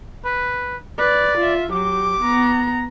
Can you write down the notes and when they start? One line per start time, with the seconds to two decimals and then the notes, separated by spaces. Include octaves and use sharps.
0.25 B4
0.99 B4 D5
1.38 F4 E5
1.72 F#3 G4 D6
2.21 B3 A#5